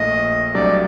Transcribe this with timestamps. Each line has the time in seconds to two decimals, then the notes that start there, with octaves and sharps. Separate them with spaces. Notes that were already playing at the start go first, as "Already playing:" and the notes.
Already playing: A#1 A#2 A3 D#5
0.54 C2 C3 F#3 A3 D4 D5